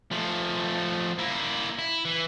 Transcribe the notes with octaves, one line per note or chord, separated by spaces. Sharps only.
F3 A3
A#3 E4
E4
E3